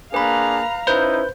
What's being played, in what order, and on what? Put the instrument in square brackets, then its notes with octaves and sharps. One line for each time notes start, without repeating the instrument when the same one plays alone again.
[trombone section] A#3 D4 G#4 [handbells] B4 B5 [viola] F5 A#5
[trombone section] C#4 D#4 E4 [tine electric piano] B4 G6 [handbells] C5